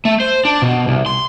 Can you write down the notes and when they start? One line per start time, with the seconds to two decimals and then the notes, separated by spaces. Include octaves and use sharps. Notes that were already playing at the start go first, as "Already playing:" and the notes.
0.05 A3
0.20 C5
0.45 D4
0.62 B2
0.88 C2
1.06 C6